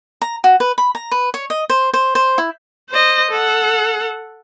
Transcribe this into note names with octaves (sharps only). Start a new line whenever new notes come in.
A#5
F#4
B4
B5
A#5
B4
C#5
D#5
C5
C5
C5
E4
C5 D#5
A4 F#5